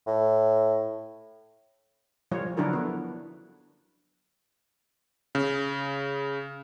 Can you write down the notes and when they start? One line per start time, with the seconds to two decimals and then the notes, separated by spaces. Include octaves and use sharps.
0.07 A2
2.31 F3 G3 F4 C#5
2.57 D3 F#3 D4 E4 F#4 A#4
2.73 B3
5.35 C#3